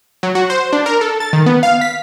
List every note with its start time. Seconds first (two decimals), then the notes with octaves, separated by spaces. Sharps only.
0.23 F#3
0.35 F#4
0.50 C5
0.73 D4
0.86 A#4
1.01 A4
1.20 A6
1.33 D#3
1.46 B3
1.63 F5
1.81 B6